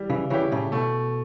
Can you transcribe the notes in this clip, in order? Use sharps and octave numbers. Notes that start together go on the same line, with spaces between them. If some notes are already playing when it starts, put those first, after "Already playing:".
Already playing: G3 E4
C#3 E3
C#3 E3 C#4 E4 G4
A2 C#3
B2 A3